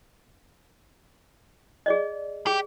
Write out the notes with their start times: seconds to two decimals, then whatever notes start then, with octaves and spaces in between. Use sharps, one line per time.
1.86 G#4 D5 D#5
2.47 G4 G#4